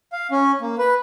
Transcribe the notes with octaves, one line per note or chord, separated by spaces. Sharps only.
F5
C#4
A#3
B4